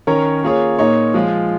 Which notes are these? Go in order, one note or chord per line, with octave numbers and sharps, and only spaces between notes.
D#3 C#4 A#4 C#5
A#3 F4 G#4 C#5
A#2 A#3 D#4 C#5
F3 G#3 F4